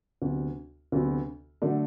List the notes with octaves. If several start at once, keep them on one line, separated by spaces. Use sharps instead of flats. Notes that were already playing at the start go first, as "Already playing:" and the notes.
D2 C3 F#3 B3
D2 C3 F#3 B3
D3 F#3 A3 D4